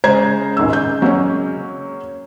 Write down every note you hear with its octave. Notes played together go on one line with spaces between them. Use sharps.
C#3 G#3 C5 A#5 G#6
D#1 G#1 E6
G6
F#3 A#3 C#4